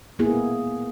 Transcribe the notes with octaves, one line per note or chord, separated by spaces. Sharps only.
A#3 B3 E4 G#4